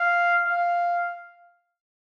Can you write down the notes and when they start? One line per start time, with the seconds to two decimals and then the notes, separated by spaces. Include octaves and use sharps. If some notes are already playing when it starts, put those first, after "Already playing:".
Already playing: F5
0.45 F5